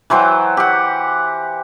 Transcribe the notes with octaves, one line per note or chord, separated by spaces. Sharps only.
E3 F#3 C5 G5
G4 F#5